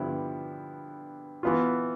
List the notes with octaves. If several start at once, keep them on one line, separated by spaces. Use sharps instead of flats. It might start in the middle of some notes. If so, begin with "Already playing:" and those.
Already playing: G2 D3 F3 B3 E4
E3 B3 F4